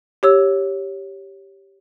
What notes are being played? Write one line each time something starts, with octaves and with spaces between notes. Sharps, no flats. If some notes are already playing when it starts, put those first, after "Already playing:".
G4 C#5 E6